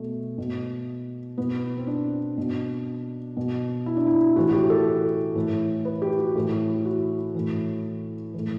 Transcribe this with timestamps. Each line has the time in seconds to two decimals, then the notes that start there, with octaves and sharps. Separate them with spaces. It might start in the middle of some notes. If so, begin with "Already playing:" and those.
Already playing: B2 A3
0.38 B2
1.38 B2 B3
1.77 C4
1.87 D4
2.38 B2
3.37 B2
3.86 E4
3.97 D4
4.07 E4
4.36 A2 E3 F#4
4.49 F#4
4.53 G4
4.70 A4
5.35 A2 E3
5.85 B4
6.02 G4
6.19 F#4
6.36 A2 E3
6.78 E4
6.85 F#4
7.34 A2 E3
8.34 E3
8.39 A2